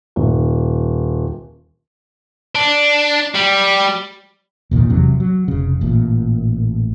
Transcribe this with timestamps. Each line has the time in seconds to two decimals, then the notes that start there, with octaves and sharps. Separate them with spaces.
0.16 D#1
2.55 D4
3.35 G3
4.71 E1 A#2 D3 D#3
4.90 F1 E2 C3 F#3
5.20 F#3
5.48 F1 C#3
5.81 A1 A#2